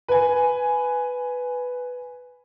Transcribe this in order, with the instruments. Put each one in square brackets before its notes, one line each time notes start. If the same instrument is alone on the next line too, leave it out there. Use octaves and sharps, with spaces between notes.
[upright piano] B4 G#5